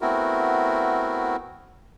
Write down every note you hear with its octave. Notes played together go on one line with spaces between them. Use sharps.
A3 B3 C4 E4 F#4 A#4